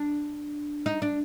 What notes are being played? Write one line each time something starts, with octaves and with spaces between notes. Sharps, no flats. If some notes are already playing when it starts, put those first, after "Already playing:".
Already playing: D4
D#4
D4